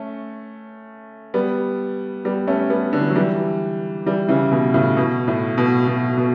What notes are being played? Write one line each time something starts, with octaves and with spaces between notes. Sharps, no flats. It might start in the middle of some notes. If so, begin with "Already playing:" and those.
Already playing: A3 C#4
G3 B3
G3 B3
A3 C#4
G3 B3
D3
E3
F#3
E3 G3
E3 G3
C#3 E3
B2
A2 C#3
B2
A2
B2
B2
B2